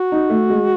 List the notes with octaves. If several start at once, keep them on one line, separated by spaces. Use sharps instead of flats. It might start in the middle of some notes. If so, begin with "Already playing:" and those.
Already playing: F#4
D#4
A3
G#3